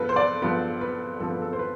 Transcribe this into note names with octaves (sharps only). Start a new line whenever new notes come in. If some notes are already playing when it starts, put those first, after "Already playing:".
Already playing: G2 F3 B3 A4 B4
C5
D5
G2 F3 B3 B4
B4
G2 F3 B3 A4
B4
A4
C5
B4